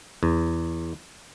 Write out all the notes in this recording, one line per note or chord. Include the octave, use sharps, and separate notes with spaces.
E2